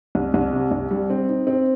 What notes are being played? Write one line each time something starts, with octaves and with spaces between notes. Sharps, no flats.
C2
C2
C3
C2
G3
C4
D#4
C4